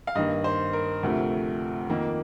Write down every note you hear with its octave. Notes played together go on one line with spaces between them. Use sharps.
F5
G2 D#3 A#3 D#5
C5
A#4
D2 C3 F3 A3
F2 D#3 A#3